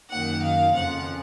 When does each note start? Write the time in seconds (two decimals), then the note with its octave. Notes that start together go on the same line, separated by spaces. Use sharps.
0.10 F#2 D#3 A#3 F#5
0.43 F5
0.74 F2 C#3 F3 F#5